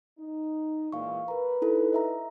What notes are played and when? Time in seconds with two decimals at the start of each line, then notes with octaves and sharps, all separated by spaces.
0.18 D#4
0.92 A#2 E3 G#3 F5 C#6
1.28 A#4 B4 A#5
1.62 D#4 E4 A4
1.93 D#5 E5 A#5